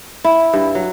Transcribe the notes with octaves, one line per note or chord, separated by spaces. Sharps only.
E4
G2
F#3